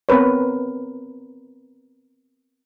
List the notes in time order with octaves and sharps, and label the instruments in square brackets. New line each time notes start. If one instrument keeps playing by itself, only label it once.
[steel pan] B3 C4 A#4 B4 C#5